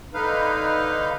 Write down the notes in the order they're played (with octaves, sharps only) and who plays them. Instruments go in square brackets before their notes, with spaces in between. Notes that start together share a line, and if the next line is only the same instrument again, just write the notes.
[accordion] D3 D#4 B4 F5